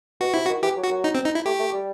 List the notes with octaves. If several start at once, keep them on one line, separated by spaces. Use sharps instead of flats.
B2 F#4
C3 E4
F#4
D#3
E3 G4
F#3
F#4
F#3
D#4
C4
D#4
E4
A3 G4
A3
G3